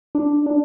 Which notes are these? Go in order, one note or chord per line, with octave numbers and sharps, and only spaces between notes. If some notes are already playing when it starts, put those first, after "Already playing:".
D4
D4